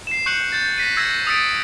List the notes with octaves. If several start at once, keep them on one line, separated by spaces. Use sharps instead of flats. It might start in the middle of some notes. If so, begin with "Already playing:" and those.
C7 E7
C#6 F#6 G6 C#7 F#7
G6 A6
A#6 B6 D#7
E6 G#6 A#6 C#7
D#6 E6 A6 B6 C#7 D7